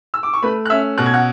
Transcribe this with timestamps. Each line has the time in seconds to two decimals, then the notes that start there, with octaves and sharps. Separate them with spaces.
0.14 E6
0.23 D6
0.33 C#6
0.42 A3 B4 B5
0.65 F#6
0.70 C#4 E5 E6
0.98 B2 F#6
1.06 G#6
1.14 F#5 F#6